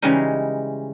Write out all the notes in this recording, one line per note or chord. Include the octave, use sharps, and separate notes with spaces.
C#3 E3 G3 G#3 C#4 D#4